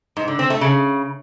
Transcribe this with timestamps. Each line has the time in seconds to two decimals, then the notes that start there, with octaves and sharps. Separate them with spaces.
0.17 G#2
0.28 D3
0.39 C4
0.50 A3
0.61 C#3